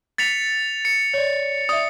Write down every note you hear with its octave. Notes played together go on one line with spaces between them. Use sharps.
A6 B6 C#7 F7
C#7
C#5 D5
D5 E5 D#6